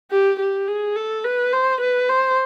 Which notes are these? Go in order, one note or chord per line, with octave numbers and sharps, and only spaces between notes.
G4
G4
G#4
A4
B4
C5
B4
C5